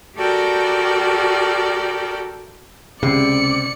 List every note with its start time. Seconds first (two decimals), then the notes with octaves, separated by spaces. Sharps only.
0.18 F#4 G4 A4 A#4 D5 G5
3.03 C#2 C3 D5 C7 C#7